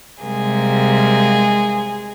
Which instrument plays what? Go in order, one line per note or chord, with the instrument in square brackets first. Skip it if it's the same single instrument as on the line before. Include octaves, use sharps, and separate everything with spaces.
[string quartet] C3 G3 G#3 A#3 G#4